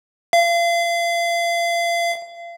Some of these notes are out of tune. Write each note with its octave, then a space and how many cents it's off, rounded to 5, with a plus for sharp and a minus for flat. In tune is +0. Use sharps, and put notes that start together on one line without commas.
F5 -35